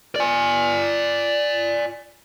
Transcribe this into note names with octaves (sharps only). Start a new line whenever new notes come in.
D5 G#5